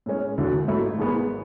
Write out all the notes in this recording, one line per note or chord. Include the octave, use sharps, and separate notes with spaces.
A2 G#3 C#4
E1 D2 D3 F#3 A3
A1 G#2 F#3 A3 E4
G#1 G#2 G#3 B3